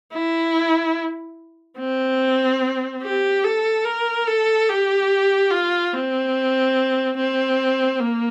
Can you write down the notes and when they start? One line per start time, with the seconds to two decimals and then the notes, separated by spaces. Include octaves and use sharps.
0.13 E4
1.78 C4
3.03 G4
3.44 A4
3.85 A#4
4.27 A4
4.69 G4
5.51 F4
5.93 C4
7.17 C4
8.00 A#3